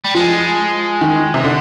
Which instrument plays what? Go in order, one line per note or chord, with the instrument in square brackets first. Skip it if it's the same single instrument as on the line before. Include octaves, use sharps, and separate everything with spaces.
[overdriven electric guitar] G3
[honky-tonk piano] F3 [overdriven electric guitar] G#3
[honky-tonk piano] D#3
C3
D3